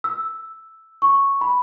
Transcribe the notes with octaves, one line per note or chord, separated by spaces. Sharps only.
E6
C#6
B5